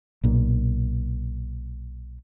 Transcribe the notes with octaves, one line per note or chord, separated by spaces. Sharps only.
B1 A#2